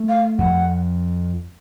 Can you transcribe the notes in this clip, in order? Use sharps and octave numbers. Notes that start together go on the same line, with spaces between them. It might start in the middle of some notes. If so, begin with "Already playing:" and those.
Already playing: A3
F5
F2 F#5